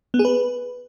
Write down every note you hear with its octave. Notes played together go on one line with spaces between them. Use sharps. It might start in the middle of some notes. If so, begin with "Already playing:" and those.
B3
G#4
B4